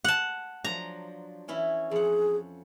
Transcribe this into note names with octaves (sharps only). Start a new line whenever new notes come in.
F#5 A5
F3 F#3 D4 A#5
E3 C#4 E4
F2 G#4 F#5